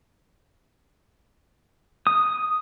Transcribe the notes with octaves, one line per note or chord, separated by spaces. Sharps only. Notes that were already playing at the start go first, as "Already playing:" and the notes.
D#6